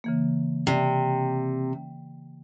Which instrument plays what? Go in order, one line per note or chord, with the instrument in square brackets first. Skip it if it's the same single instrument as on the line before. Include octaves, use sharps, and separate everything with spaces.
[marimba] C#3 E3 A#3
[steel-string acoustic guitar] C3 [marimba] D5